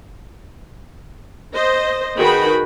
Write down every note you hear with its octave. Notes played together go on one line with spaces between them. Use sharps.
C5 D#5
D#3 F#4 G#4 B4 G5 B5